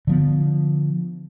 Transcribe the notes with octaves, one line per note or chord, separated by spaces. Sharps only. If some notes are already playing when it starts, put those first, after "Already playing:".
D3 F3 B3